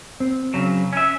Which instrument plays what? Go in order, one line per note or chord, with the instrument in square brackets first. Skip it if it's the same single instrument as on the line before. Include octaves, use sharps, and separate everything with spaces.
[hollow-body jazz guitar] C4
[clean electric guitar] C#3 F#3
C#4 E5